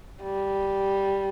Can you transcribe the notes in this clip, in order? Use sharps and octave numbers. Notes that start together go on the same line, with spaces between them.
G3